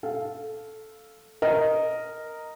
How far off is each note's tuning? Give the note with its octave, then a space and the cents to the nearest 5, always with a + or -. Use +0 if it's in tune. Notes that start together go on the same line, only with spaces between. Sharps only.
A4 -10 F5 +0
A#4 -5 D#5 +0